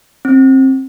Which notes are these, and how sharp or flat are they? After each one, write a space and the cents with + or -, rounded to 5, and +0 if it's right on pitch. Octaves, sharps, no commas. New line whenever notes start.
C4 +25